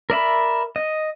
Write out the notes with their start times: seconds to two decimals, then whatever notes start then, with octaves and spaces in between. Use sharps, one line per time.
0.10 A#4 D5 E5 B5
0.76 D#5